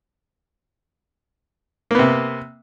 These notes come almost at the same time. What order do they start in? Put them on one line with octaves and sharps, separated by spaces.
A#3 B3 C3